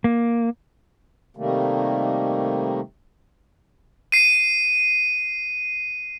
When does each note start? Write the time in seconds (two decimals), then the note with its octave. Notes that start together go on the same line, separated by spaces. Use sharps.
0.04 A#3
1.37 C3 D#3 G3 A3 A#3
4.12 C7 D#7